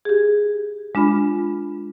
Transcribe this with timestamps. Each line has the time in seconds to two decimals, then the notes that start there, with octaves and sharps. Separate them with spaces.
0.05 G4 G#4
0.95 G#3 D4 F4 B5